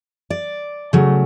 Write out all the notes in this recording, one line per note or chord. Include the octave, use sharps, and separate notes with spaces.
D5
C#3 F#3 A3